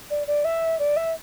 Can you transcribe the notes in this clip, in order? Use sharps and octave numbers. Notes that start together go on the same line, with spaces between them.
D5
D5
E5
D5
E5